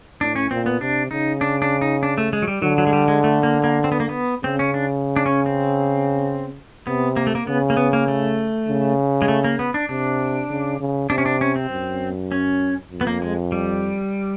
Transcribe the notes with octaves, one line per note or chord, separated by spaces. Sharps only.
A2 D4
C#4
A#2 C4
B3
C3 D4
C#3 D#4
D4
D4
D#4
D4
A3
G#3
F#3
G3
D3 F#3
F#3
G#3
G3
G#3
A3
A#3
A#3
C4
B3
A#3
B3
C#3 C4
C#4
D4
D4
C#4
C4
C3 B3
A#3
A3
A#3
C#3 B3
A#3
B3
A#3
A3
C#3
G#3
A3
A#3
B3
D4
C3 D4
C#3
C#3
C3 D4
C#4
D4
C#4
C4
F#2
C#4
F2
B3
A#3
G#3
G3